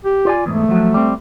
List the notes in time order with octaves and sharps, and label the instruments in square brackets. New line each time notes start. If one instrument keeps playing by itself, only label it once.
[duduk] G4
[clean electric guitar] F4 D5 G#5
[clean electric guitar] E2 G#2 [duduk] A3
[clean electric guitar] F3 F#3
G3 C4